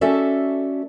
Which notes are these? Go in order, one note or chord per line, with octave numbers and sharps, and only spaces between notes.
A3 C#4 F#4 A4 D5 E5